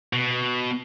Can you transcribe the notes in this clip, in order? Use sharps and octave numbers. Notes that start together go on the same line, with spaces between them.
B2